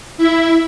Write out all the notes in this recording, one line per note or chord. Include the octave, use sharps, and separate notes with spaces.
E4 E5